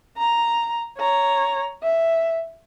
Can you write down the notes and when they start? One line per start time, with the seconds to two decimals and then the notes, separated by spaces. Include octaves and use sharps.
0.17 A#5
0.98 C#5 A#5
1.83 E5